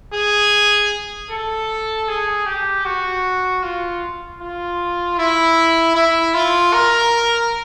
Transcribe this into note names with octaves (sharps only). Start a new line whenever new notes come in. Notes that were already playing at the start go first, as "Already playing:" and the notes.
G#4
A4
G#4
G4
F#4
F4
F4
E4
E4
F4
A#4